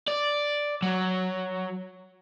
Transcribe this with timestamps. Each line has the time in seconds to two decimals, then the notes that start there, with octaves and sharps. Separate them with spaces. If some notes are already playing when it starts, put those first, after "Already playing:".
0.08 D5
0.82 F#3